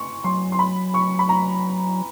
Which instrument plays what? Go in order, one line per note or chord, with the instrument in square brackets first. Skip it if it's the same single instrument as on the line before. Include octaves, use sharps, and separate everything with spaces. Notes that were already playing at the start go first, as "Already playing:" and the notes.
Already playing: [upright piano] C6 C#6
[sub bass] F#3 [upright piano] C6
[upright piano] C6
B5
C#6
B5
A#5